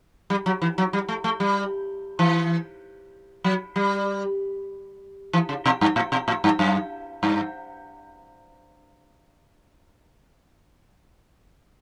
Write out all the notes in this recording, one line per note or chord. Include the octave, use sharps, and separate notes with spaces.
G3
F#3
E3
F#3
G3
A3
A3
G3
E3
F#3
G3
E3
C#3
B2
G2
A2
B2
A2
G2
F#2
G2